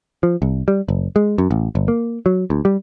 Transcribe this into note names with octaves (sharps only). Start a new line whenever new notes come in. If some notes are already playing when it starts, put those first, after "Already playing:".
F3
C2
G3
F#1
G#3
F#2
A1
G1
A#3
F#3
D2
G3